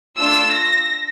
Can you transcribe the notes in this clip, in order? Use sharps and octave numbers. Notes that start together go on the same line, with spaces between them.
A3 D4 F4 E6
A#6